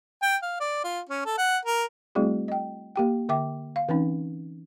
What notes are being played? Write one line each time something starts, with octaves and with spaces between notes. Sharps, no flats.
G5
F5
D5
F4
C#4
A4
F#5
A#4
G3 A3 C4 E4 F#4 G#4
D#5 G5
A#3 G4 G5
D3 E5 G5 D6
F5
E3 C4 C#4 D#4